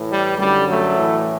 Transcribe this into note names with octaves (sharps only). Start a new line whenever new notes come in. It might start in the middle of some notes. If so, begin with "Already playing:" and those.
Already playing: A2 E3
G3
F#2 D3 G3
F#3 A3
A2 E3